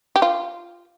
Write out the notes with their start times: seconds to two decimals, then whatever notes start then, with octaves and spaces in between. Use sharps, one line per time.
0.16 G4
0.22 F4